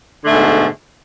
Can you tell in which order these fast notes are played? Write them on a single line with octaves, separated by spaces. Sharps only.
D3 A3 G#2 B2